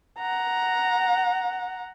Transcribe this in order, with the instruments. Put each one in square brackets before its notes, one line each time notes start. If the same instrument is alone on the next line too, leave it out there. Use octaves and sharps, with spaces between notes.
[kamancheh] F#5 A#5